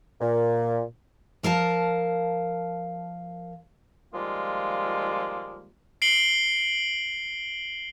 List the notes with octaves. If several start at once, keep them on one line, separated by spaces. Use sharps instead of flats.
A#2
F3 A#4 F5 A5
D#3 F3 G3 G#3 A#3 F4
C7 D7 F#7 G7